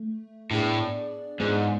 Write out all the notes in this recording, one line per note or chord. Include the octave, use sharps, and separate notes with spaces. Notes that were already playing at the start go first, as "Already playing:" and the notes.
Already playing: A3
A2 B3 D4 G#4 D5
G#2 F3 B3 D4 G#4